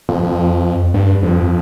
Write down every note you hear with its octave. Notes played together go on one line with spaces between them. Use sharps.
F2
F2
G2
F2